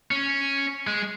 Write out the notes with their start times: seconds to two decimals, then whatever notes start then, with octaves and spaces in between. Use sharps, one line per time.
0.11 C#4
0.87 G#3